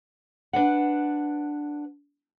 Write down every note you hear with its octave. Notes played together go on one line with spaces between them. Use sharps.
D4 B4 F#5